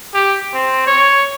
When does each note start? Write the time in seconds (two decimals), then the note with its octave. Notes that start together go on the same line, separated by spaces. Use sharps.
0.14 G4
0.54 C4
0.87 C#5